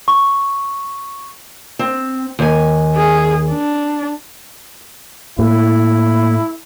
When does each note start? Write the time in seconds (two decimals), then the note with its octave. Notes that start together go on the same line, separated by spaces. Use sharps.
0.08 C#6
1.79 C4
2.39 D#2 G#5
2.96 G#4
3.50 D4
5.39 A2 A#3 E4